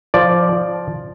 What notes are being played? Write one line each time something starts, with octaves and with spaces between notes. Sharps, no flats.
F3 D5
F3